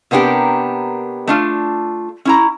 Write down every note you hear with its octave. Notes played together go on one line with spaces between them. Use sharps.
C3 A#3 B3 D4 G4 A#4
A3 D4 F4
C#4 E4 A#5